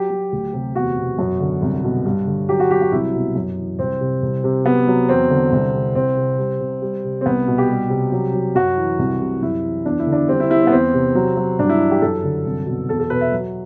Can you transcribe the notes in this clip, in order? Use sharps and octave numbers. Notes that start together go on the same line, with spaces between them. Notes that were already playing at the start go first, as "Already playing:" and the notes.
Already playing: F#3 G4
F#3
D2
C3
E2 F#4
B2
F#2
D3
C2
B2
G2
D3
F#3 G4
F#4
F#3 G4
F#4
C2 E4
B2
F#2
E3
C2 C4
C3
C2
C3
F#3 B3
F#3
E2 C4
D3
C2
C3
C2 C4
C3
G3
C3
G3
C3
C4
C2 B3
B2
G4
G3
C3
F#3
F#3
F#2 F#4
E3
C2
C3
F#2 E4
E3
E2 D4
E4
D3
D4
G3 C4
E4
G3 E4
C4
B3
E2 C4
C3
F#3
F#3
G2 D4
E4
E3
G4
F#2 A4
D3
C2
B2
E2 A4
A4
B2 B4
E5
F#3